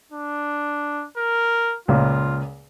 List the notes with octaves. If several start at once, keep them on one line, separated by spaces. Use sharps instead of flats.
D4
A#4
C#2 A#2 F4